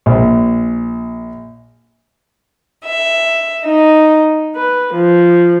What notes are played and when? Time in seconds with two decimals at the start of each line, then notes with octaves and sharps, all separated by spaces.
0.06 A#1
2.85 E5
3.63 D#4
4.54 B4
4.94 F3